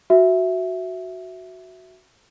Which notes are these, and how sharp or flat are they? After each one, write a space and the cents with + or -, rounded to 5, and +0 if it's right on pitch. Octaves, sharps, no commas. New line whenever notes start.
F#4 +0 E5 +0